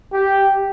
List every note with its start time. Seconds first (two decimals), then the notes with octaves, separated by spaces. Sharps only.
0.13 G4